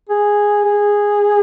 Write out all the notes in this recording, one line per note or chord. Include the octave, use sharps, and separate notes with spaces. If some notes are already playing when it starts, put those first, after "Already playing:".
G#4
G#4